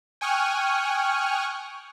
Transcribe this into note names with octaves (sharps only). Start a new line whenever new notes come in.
G5 G#5 C#6 D#6 F6 F#6